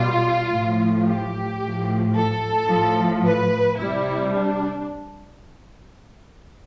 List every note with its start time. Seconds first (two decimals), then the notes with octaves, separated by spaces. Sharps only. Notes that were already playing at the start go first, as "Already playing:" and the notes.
Already playing: B2 G3 F4
0.52 A2 F3
1.06 G4
1.60 A2 F3
2.15 A4
2.69 A2 F3
3.23 B4
3.78 C3 G3 E4
4.32 D4